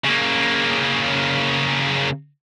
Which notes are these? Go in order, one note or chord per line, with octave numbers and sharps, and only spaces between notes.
C#3 A#3